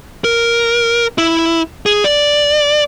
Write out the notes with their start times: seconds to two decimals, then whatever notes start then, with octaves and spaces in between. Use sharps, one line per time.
0.24 A#4
1.18 E4
1.86 G#4
2.04 D5